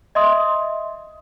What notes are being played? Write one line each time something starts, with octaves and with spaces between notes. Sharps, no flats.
D#5 E5 C6 D#6